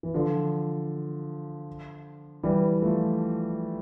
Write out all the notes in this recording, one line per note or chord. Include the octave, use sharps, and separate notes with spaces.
E3
D3 F3
E3 G3
F3 A3